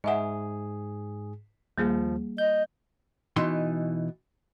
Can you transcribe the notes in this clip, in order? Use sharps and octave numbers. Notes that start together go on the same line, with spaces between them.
G#2 G#4 D#5 E5 F#5
D#2 F3 G3 A#3 G#4
D#5 G6
B2 E3 D#4 C6